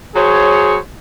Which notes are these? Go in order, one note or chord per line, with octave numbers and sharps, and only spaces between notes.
F#3 G#4 C5 C#5